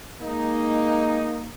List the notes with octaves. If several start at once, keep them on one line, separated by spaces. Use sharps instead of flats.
G#3 A#3 D#4